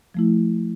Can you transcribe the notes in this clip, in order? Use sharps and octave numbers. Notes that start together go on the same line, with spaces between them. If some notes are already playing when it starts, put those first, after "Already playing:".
F3 A3 E4